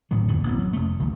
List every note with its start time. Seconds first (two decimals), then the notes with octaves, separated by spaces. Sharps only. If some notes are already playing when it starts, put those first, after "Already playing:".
0.11 G#1 A2 D3 F#3
0.28 D#1 F2 D3 D#3
0.43 A1 B3
0.59 F#3
0.73 F1 A3
1.00 G1 C#2 D#3 F3